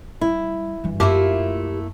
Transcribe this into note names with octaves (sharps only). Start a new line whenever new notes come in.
G3 E4
G2 E3
F#2 A3 A#3 E4 F4 G4 E5